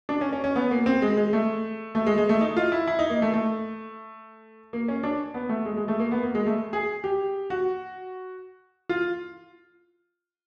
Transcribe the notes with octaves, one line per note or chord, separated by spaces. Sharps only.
D4
C#4
C#4
C#4
B3
A#3
C4
G#3
G#3
A3
A3
G#3
G#3
A3
D#4
F4
E4
E4
D#4
A#3
A3
A3
A#3
C#4
D4
B3
A3
G#3
G#3
A3
A#3
B3
A#3
G#3
A3
G#4
G4
F#4
F4